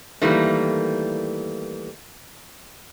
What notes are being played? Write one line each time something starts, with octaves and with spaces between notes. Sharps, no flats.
D#3 E3 G3 A3 A#3